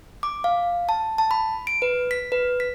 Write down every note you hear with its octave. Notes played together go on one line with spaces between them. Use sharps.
D6
F5
A5
A5
B5
D7
B4
B6
B4
B6